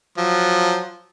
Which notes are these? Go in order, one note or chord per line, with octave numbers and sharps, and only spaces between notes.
F3 F#3